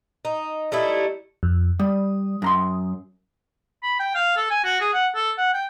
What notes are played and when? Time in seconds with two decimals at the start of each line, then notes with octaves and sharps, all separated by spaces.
0.25 D#4
0.72 G3 A3 D#4 E4
1.43 F2
1.80 G3 D#6
2.42 F#2 A#5 C6
3.83 B5
3.99 G5
4.15 F5
4.36 A4
4.50 G#5
4.64 F#4
4.81 G#4
4.93 F#5
5.15 A4
5.38 F#5
5.53 G5